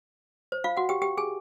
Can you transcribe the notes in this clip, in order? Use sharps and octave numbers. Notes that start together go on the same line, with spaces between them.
C5
F4 F5
F#4 F#5
G4 G5
G4 G5
G#4 G#5